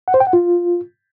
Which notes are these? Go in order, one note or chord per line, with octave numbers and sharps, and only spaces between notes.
F#5
C5
G5
F#5
F4